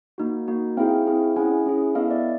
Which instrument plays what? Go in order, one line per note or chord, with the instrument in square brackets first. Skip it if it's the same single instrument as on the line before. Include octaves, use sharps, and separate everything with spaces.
[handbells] A#3 D#4 F#4
A#3 D#4 F#4
C4 E4 G#4 F5 G5
C4 E4 G#4
C#4 E4 G#4 F#5 G#5
C#4 E4 G#4
B3 E4 A4 D#5 F5
D5 E5